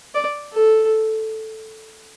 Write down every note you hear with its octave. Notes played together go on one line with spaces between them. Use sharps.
D5
A4